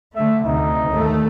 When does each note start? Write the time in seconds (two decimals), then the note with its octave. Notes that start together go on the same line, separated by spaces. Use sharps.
0.16 D3 A3 E5
0.46 D2 C3 D#4
0.89 D#2 A3